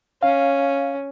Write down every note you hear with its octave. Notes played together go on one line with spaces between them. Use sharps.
C#4 F5